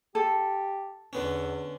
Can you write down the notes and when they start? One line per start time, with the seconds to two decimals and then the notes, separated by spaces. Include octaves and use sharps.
0.15 G4 A4
1.13 E2 D3 B3 C#4